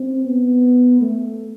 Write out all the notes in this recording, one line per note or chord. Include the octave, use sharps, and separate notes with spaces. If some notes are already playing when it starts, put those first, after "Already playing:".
Already playing: C4
B3
A3